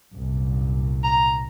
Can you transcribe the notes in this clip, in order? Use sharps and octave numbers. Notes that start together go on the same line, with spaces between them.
C2 F#2 A#2
A#5